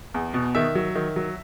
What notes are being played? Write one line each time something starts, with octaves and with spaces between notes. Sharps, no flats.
E2
B2
D#3 E5
F#3
D#3
F#3